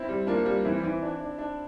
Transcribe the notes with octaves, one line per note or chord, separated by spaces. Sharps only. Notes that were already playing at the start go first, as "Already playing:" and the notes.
Already playing: C4 E4
G3
A#3 D4 F4
G3
E3 C4 E4
E3
D4
D4
D4